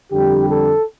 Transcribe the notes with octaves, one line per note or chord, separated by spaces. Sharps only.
F2 D3 G3 G4
A4